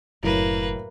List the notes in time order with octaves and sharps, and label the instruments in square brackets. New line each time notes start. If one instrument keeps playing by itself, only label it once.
[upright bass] F#1 [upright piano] F#2 A2 [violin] A#3 B4